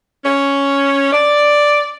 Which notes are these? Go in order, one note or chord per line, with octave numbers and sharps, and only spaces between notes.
C#4
D5